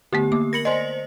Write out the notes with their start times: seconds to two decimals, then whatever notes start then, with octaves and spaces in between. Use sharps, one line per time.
0.13 D3 A3 B3 G4
0.32 A#3 D6
0.53 A#4 B5 A#6 C#7 F#7
0.65 C5 D5 D#5 G#5 C6